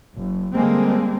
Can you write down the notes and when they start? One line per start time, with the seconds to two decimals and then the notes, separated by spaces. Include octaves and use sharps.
0.17 F#1
0.54 D3 G3 G#3 A#3 C4